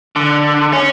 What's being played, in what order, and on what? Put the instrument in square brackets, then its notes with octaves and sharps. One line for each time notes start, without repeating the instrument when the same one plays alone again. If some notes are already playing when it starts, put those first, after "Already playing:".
[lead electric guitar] D3
C#4